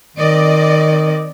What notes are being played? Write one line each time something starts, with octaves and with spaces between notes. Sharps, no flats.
D#3 C4 D5 D#5